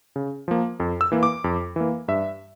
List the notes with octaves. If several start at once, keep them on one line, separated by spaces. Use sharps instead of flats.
C#3
F3 A#3
F2
E6
E3 A#3
D6
F2
E3 A#3
G2 E5